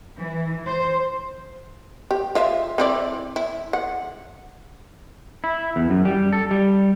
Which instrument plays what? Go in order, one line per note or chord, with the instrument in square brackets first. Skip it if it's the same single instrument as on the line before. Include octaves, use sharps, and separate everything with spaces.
[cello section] E3
C5
[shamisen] G4
F4 E5
C4 E4 D5
E4
F#5
[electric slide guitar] E4
E2
F#2
G3
A4
G3